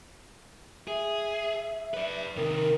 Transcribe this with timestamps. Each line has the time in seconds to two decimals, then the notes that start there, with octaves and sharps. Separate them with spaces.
0.88 G#4 E5
1.94 B4 D5
2.37 C3 D#3 A#4